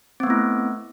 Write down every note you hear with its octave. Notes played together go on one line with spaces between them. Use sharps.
A3 B3 C4 E4